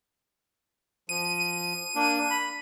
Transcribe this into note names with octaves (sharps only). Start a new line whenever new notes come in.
F3 D#7
A#3 D4
B5